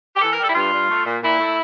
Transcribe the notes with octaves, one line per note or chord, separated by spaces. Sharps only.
G4
E3 A4
A#4
G3
A4
E4
G2 F4
G2
A3
A#2
A#2 E4
A3